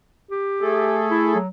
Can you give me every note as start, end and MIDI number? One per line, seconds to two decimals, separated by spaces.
0.31 1.05 67
0.61 1.37 57
0.61 1.37 68
0.61 1.37 69
1.11 1.33 64
1.35 1.48 54